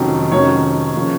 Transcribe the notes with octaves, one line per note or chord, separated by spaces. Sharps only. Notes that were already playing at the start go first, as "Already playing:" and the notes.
Already playing: F1 F2 D#3 F#3 C#4
F1 F2 D#3 F#3 C#4 C#5
C#3 F3 A#3 C#4